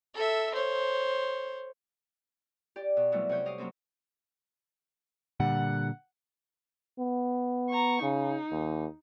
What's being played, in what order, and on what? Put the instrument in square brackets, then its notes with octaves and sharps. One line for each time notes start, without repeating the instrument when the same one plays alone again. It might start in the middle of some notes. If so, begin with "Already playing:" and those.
[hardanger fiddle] A4 E5
C5 C#5
[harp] G4 D5
B2
E3 F#3 G3 A3 B3 C4
C3 F#4 C#5 G6
G4 D#5 F5
F#3 A#3 C4 C#4
[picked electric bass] A#2 D3 G3 [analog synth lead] F#5
[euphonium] B3
[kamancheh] A#5 C#6
[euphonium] C#3 [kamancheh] D#4
[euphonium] D#2